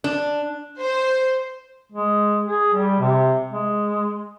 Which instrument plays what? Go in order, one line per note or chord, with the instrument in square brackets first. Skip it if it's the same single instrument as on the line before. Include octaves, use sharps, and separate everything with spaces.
[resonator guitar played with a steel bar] D4
[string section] C5
[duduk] G#3
G#4
G3
C3
G#3